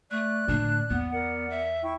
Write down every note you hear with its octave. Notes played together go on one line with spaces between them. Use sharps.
A3 D5 F#6
A2 D3 D4
E2 B3
A#4 D5 F#5
E5
E4 G5 C#6